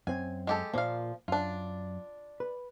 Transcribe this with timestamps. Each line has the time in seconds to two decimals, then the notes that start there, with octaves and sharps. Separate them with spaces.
0.07 F#2 C4 G#5
0.47 G#3 G4 A4
0.74 A#2 F3 A#3 F5
1.28 F#2 D4 F4
2.40 B4